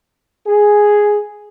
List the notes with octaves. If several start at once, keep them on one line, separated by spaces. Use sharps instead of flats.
G#4